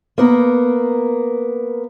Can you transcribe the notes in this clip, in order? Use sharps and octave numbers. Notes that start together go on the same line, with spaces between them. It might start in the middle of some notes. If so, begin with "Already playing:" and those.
A#3 B3 A#4